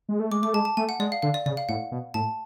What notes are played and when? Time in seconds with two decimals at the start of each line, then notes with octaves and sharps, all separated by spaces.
0.09 G#3
0.20 A3
0.31 G#3 D6
0.42 A3 D6
0.54 G#3 A5
0.65 A5
0.77 A3 G#5
0.89 F#5
1.00 G#3 D5
1.12 F5
1.22 D3 F5
1.34 D5
1.46 C#3 D5
1.57 F5
1.69 A2 F#5
1.92 B2
2.14 A2 A5